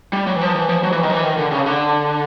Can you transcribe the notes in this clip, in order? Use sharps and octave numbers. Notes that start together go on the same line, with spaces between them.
G3
F#3
E3
F3
E3
F3
F#3
E3
D#3
F3
E3
D#3
D3
C#3
D3